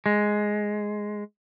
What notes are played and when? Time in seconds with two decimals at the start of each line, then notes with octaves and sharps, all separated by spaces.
0.06 G#3